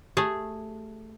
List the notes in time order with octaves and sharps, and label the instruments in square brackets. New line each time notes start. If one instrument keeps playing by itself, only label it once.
[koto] A3 G#4 [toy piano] G4